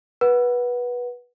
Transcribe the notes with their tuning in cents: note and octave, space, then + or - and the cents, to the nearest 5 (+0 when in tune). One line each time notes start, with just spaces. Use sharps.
B4 -20 F#5 +0